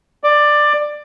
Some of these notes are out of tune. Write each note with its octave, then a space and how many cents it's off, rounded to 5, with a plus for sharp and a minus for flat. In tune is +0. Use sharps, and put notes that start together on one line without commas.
D5 +15